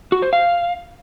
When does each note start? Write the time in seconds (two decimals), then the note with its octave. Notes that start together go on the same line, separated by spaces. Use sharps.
0.12 F#4
0.22 C5
0.33 F5